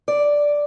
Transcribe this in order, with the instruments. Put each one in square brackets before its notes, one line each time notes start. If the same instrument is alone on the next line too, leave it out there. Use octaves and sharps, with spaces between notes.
[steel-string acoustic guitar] D5